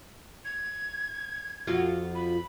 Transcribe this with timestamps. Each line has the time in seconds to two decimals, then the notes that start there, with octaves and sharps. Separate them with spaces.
0.45 G#6
1.67 F2 F4 F#4
2.15 B5